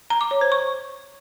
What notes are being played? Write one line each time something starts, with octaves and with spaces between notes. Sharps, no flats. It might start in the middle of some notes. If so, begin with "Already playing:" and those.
A#5
D6
C#5
C5
C#6